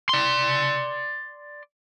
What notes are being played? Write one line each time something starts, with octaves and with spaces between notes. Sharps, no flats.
D5 C6